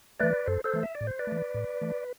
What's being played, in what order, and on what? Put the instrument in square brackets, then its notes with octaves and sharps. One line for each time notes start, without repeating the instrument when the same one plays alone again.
[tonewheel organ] E3 A3 B4 D5
F#2 A4 C5
A4 C5
E3 A3
E5
D5
A2
C5
B4 D5
E3 A3
A2
E3 A3